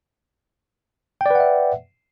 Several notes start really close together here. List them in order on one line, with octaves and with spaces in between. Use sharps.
G5 D5 B4 F#5 E5